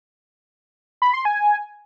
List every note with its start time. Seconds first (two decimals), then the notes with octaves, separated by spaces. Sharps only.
1.02 B5
1.13 C6
1.25 G#5